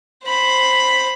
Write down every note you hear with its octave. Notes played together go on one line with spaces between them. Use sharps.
C5 B5